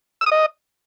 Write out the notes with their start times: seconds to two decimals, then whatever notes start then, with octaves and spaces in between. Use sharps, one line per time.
0.21 E6
0.26 D#6
0.32 D#5